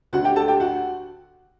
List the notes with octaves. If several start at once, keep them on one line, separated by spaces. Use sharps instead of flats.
D2 D3 F#4 F#5
G4 G5
A4 A5
G4 G5
F#4 F#5